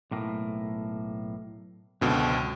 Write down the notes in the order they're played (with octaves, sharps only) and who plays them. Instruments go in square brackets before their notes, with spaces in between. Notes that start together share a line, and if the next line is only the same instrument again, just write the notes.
[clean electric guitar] B1 A2 A#3
[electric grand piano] C#2 B2 D3 [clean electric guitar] F#2 C4